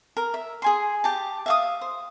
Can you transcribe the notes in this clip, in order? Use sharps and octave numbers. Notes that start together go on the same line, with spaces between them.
A#4
E5
G#4 G#5 C6
G4 A5
E5 F5 D#6
C5